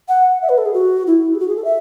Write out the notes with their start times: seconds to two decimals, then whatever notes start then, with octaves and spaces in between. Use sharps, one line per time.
0.08 F#5
0.42 E5
0.49 B4
0.58 A4
0.65 G#4
0.73 F#4
1.07 E4
1.35 G#4
1.40 F#4
1.48 G#4
1.56 A4
1.64 E5